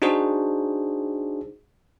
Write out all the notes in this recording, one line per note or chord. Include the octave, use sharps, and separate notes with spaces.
D4 D#4 F#4 G#4 C5